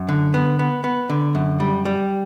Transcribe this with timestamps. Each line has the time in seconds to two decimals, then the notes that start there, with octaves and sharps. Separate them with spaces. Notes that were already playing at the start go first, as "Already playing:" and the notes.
Already playing: F#2
0.09 D3
0.34 B3
0.59 B3
0.84 B3
1.10 D3
1.35 F#2
1.60 G3
1.85 G3